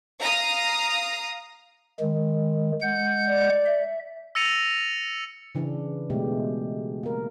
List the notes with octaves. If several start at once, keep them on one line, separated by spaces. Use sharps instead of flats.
F5 A#5 D#6
D#3 G#3
G#3 F#5 G6
D5
E5
E6 A6 A#6 C#7 D#7 F7
C#3 E3 D4
B2 G#3 A3 G4
A#3 A#4